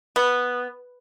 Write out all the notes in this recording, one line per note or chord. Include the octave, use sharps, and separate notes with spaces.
B3